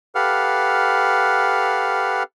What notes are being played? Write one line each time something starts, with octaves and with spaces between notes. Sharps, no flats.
G4 A4 B4 F5 F#5 F6